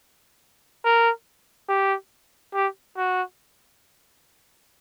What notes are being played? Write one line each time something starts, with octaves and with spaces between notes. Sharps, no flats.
A#4
G4
G4
F#4